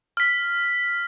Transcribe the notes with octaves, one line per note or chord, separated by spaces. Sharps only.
F6 B6